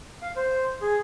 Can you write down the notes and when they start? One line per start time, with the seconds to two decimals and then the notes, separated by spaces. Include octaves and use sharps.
0.22 F5
0.36 C5
0.82 G#4